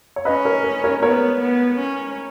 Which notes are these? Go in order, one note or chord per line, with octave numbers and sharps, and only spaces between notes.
C#5
C#4 B4 D#5
A#4 C#5
A#4
A#4 C#5
B3 A#4 C#5
B3
C#4